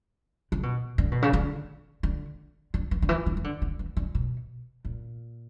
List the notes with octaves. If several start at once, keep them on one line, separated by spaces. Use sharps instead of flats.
C#3
B2
D3
B2
C#3
D3
D3
D3
E3
D3
E3
D3
E3
D3
D3
E3
D3
B2
A#2